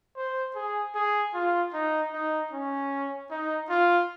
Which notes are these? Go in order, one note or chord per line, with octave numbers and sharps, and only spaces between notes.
C5
G#4
G#4
F4
D#4
D#4
C#4
D#4
F4